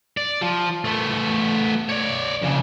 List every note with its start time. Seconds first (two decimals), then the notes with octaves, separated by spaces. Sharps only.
0.17 D5
0.42 F3
0.85 A3 B3
1.90 C#5 D5
2.43 F2 C#3